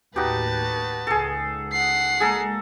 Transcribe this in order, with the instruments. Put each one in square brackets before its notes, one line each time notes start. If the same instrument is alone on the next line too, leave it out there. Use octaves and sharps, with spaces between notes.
[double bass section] D#2 A2 [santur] D#4 F#4 G4 [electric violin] B4 A5
[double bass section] C#2 [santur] G#4 A4
[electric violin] F#5 C7
[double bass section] G#3 A#3 [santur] G#4 A4 A#5